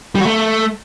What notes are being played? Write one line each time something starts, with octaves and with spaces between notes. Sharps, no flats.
G3
F#4
A3